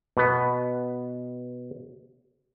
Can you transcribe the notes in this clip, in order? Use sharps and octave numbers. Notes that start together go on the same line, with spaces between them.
B2 B3